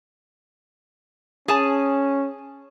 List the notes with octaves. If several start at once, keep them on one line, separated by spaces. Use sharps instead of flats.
C#4 G#4 G#5 A5